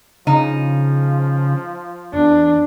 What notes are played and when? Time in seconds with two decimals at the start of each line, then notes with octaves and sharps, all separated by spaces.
0.27 C#3 F3 D#4
2.14 E2 D4